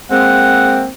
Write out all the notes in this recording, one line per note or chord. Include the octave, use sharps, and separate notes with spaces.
G#3 A#3 C4 F#5